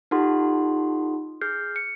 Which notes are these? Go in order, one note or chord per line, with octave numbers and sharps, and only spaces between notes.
D#4 F4 G4 A4 F#5 C6
G#4 F6 G6 C7
C#7